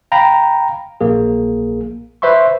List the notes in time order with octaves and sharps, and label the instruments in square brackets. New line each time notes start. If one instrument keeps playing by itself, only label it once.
[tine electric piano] F5 G5 A#5 B5
A#1 A#3 G#4
B4 C5 E5 C6 C#6